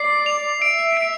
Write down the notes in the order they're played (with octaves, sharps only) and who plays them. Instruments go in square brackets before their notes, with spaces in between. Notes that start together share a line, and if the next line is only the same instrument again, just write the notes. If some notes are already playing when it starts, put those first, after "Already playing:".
Already playing: [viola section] D5 [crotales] C7
[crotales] F7
[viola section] E5 [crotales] D7
[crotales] D7